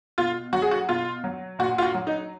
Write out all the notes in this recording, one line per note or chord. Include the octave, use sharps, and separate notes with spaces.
B2 F4
F#3 F#4
G#4
F#4
B2 F4
F#3
A#2 F#4
F4
F#4
F#3
D#4